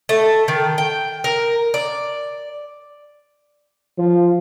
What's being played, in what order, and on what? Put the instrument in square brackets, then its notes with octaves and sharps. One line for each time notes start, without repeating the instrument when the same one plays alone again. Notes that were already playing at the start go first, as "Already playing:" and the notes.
[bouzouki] A3
D#3
G5
A#4
D5
[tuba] F3